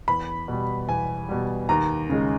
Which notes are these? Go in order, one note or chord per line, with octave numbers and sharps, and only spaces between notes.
E2 B5
B2 G3
E2 G#5
B2 G3
D#2 A#5
C#3 G#3